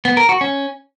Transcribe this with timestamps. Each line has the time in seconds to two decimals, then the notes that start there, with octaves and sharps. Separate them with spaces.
0.05 B3
0.17 A#4
0.29 F#4
0.41 C#4